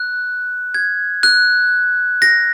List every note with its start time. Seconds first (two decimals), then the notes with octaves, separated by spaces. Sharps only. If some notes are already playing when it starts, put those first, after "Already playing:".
Already playing: F#6
0.74 G#6
1.23 F#6
2.22 A#6